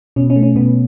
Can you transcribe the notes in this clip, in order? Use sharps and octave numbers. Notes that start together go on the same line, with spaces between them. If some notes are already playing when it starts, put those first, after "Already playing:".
B2 C#4
C#4
A3
C#4
B2 B3